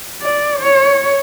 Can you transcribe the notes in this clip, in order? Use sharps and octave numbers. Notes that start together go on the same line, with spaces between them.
D5
C#5